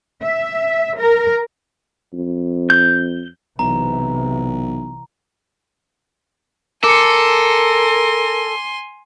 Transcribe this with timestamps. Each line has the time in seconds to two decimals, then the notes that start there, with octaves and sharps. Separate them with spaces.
0.24 E5
0.99 A#4
2.13 F2
2.70 G6
3.59 B1 C3 E3 A#5
6.84 A4 A#4 G#5 C6 D6 C#7